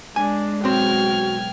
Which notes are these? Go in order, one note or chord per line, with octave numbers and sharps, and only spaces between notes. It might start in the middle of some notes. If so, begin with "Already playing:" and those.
G#3 D4 G#5
B1 C4 F#4 G5 C6 F6 G#6